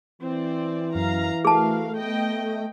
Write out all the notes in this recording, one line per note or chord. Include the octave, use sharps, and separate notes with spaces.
E3 C4 D5
F#2 F5 A#5
A3 F#4 G#4 A#4 F5 A5
B3 D#5 G5